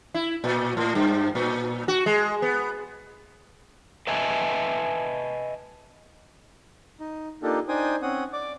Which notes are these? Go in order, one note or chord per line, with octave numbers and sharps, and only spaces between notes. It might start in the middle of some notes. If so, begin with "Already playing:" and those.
E4
A#2
A2
G2
A#2
F#4
G#3
B3
B4 D#5 E5 G#5 A5
D#4
A#3 D4 D#4 F4 G4 A4
D4 D#4 C5 G5 G#5 D#6
C4 C#4 F#5 D#6
D5 D6